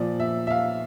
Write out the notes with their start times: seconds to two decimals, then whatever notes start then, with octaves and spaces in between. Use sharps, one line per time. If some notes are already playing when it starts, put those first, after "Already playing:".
Already playing: A#2 F3 D5
0.20 E5
0.47 E5
0.51 F5